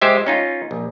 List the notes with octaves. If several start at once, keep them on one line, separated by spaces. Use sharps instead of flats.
G#3 G4 C5 E5
C#4 D#4 F4
A#1